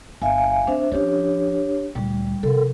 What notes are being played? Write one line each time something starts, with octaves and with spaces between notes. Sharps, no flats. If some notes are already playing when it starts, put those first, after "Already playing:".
G1 E5 F5 G#5
C4 D4 C5 E5
F3 C#4 D4 G4 C#5
D2 A#2 G3
C3 F3 A4 A#4